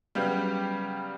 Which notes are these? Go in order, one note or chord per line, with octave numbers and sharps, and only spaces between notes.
C#3 F#3 G3 B3 G4